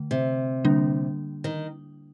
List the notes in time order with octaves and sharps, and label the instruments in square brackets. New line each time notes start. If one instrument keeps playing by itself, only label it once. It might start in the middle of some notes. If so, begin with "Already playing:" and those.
Already playing: [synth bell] D3 A3
[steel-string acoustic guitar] C3
[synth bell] D3 G3 A#3 D4
[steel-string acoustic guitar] D#3